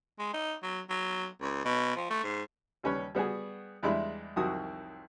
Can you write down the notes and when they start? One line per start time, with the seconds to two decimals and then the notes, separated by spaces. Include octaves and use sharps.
0.19 G#3
0.33 D#4
0.63 F#3
0.90 F#3
1.41 C#2
1.65 B2
1.97 F3
2.10 A3
2.24 G#2
2.83 D#2 G3 C#4 B4 C#5
3.15 G3 B3 F#4 G#4
3.83 E2 G3 G#3 D4 E4 B5
4.36 C2 F2 D#3 F#3 F#4 D#6